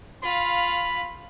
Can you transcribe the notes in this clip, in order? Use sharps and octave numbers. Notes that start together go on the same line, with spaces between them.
F4 F5 B5